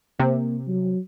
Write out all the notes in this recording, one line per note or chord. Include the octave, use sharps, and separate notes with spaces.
C3 A#3
F#3